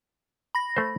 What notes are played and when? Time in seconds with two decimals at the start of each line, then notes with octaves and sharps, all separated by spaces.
0.55 B5 A#6
0.77 A3 C5